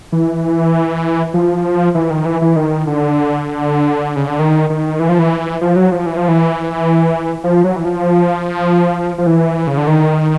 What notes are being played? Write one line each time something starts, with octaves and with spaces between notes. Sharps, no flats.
E3
F3
E3
D#3
E3
E3
D#3
D3
C#3
D3
D#3
D#3
E3
F3
E3
F3
F#3
F3
E3
F3
E3
F3
F#3
E3
F3
F3
E3
C#3
D3
D#3